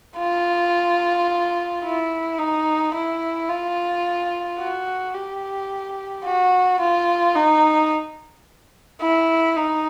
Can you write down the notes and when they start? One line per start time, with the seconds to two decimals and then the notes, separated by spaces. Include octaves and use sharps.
0.18 F4
1.84 E4
2.38 D#4
2.94 E4
3.49 F4
4.59 F#4
5.14 G4
6.24 F#4
6.79 F4
7.35 D#4
9.01 E4
9.56 D#4